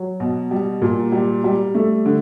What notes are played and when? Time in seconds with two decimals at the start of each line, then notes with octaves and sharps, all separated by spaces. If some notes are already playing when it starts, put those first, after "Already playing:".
Already playing: F#3
0.20 B2
0.51 G3
0.82 A#2
1.12 G3
1.44 G3
1.75 A3
2.06 D3